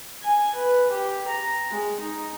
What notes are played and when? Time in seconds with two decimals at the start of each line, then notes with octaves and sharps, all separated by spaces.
0.23 G#5
0.55 B4
0.91 G4
1.28 A#5
1.71 G#3
2.00 D#4